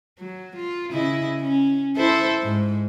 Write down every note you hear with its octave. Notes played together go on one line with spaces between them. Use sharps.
F#3
F4
C#3 E4 D#5
C#4
E4 A4 C5
G#2